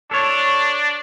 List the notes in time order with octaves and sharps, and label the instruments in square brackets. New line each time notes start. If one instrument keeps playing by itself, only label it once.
[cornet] D4 [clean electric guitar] A4 C#5